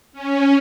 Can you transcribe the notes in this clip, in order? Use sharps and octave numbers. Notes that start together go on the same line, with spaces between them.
C#4